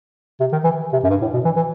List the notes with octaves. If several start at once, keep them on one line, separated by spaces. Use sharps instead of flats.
C3
D#3
E3
C3
F#2
G2
A2
B2
E3
E3